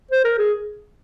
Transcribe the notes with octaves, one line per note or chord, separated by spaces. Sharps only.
C5
A#4
G#4